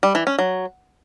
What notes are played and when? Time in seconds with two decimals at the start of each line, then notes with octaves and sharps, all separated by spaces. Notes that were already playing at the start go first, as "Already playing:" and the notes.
0.03 G3
0.15 E3
0.27 C#4
0.39 F#3